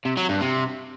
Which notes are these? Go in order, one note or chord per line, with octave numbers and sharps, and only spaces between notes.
C3
F#3
G2
C3